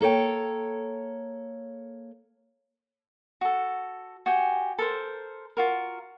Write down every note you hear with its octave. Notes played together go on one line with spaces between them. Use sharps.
A#3 A4 C#5 G5
F#4 A4
F#4 G4 G5 G#5
A4 A#4 C5
F4 F#4 A#4